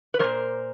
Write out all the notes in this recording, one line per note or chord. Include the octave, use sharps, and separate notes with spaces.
B4
A#2 F#3 A#4 C5